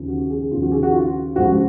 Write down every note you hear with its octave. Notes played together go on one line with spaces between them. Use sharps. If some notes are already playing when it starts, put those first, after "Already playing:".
Already playing: D#2 C#3 F3
F#4
G#4
D#2 C#3 F3 F4
F#4
G#4
F#4
F4
C#2 C#3 F3 F#4